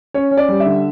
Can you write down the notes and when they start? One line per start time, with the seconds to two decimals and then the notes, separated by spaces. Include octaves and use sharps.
0.14 C#4 C#5
0.31 C#4
0.37 D5
0.49 G3
0.60 E5
0.66 D3